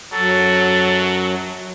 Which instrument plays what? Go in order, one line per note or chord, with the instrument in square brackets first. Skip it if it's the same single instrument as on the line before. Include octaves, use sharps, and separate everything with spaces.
[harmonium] F#2 [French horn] F#3 [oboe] A4